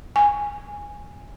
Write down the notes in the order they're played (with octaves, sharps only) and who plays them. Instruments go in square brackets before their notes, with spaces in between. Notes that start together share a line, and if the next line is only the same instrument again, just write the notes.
[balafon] G#5